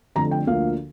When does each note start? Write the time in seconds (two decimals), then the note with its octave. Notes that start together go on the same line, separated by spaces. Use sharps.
0.15 F1 F2 D3 A#5
0.31 G5
0.47 D2 D3 F3 A#3 F5